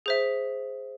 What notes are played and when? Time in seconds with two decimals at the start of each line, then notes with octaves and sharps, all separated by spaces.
0.06 G#4 C5 E5